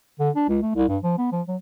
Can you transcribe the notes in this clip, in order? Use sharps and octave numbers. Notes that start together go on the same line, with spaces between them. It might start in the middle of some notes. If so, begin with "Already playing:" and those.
D3
D4
C#2
A3
C2
G2
F3
B3
F3
F#3